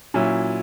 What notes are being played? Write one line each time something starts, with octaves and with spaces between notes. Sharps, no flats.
A#2 F#3 C#4 E4